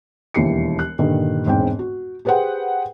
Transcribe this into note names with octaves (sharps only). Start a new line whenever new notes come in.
E1 D#2 E3 G3 C7 C#7
F#6
G2 A#2 D3 D#3 G3
E1 G#2 C4 G5
F#4
G4 G#4 B4 C5 F#5 G5